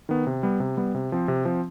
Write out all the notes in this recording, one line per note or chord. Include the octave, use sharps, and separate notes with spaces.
D#3 B3
C3
G3 B3
C3
G3 B3
C3
F3 C4
C3
F3 C4